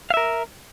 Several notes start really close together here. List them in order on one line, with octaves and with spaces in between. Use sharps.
F5 E5 A#4